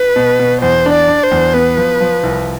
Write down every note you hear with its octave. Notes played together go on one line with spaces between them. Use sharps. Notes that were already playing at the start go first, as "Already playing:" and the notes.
Already playing: B4
B2
B2
E2 C5
D4
D5
D4
C5
E2
B3 B4
F3
F3
C2